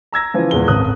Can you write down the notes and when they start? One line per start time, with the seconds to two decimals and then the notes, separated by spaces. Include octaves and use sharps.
0.12 A#5 E6 G#6 A#6
0.34 C#3 E3 F3
0.51 E2 A#2 G#3 G7
0.68 D#1 G#1 D#6 F#6